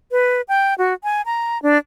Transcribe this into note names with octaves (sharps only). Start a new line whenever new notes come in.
B4
G5
F#4
G#5
A#5
D4